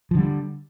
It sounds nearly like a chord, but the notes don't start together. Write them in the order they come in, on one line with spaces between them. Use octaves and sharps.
F3 D3 G3